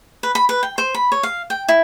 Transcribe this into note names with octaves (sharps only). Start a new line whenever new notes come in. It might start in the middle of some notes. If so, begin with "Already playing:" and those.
B4
B5
B4
G5
C5
B5
C#5
F5
G5
E4